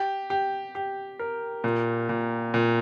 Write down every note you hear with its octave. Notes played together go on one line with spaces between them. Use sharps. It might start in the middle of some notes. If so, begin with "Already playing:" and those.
Already playing: G4
G4
G4
A#4
A#2
A#2
A#2